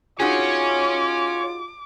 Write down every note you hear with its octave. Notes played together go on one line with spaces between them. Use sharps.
D#4 F4 F#4 G#4 C#5 G#5 D6